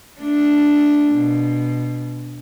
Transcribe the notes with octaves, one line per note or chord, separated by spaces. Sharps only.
A3 D4
B2